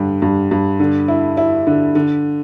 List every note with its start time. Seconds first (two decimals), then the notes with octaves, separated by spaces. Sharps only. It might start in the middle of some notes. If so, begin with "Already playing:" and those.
Already playing: G2 D3
0.22 G2
0.51 G2
0.80 D3
1.08 E4
1.37 E4
1.67 D3
1.95 D3